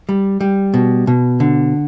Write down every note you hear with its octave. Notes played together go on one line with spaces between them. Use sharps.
G3
G3
B2
B2
D3